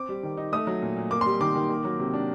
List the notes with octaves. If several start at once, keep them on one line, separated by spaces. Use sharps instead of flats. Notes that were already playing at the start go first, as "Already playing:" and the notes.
Already playing: C4 D6
G3
D#3
D#4
A3 D#6
F#3
A#2
A#2
A#3 D6
C6
G3
D#3 D6
D#3
A#3
F#3
C3
D4